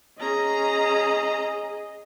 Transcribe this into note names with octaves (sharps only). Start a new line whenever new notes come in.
C#4 G#4 D#5 A#5